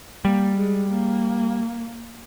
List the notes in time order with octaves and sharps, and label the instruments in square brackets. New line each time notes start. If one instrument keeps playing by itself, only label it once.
[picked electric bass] G3 [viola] A#3
[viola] G#3
A#3